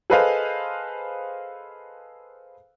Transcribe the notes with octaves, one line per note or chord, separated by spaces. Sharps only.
G#4 A4 B4 C5 D#5 F5